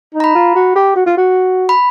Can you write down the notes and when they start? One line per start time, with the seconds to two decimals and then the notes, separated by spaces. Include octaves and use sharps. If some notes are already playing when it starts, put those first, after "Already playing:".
0.14 D#4
0.20 A#5
0.24 B5
0.35 F4
0.55 F#4
0.75 G4
0.96 F#4
1.06 F4
1.17 F#4
1.69 B5